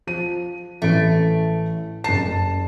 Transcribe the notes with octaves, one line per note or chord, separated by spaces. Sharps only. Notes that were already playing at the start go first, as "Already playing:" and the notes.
F3 D#7
A1 E3 A3 D7
F#1 A5 C7